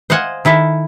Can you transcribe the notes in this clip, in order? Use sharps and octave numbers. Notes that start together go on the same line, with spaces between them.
C5 D#5 F5 F#5 G#5
D#3 E4 A4 E5